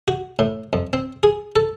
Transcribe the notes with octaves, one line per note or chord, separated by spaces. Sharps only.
F#4
A2
F2
C4
G#4
A4